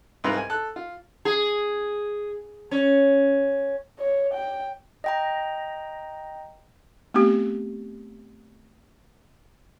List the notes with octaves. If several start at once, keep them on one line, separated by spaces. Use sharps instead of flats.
C2 G#2 F4 B4 A#5
G#5
A4 F#6
F4
G#4
C#4
C#5
G5
D#5 G5 A#5
A3 B3 C4 G4